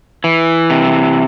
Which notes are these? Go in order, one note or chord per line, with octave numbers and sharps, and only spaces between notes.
E3
C3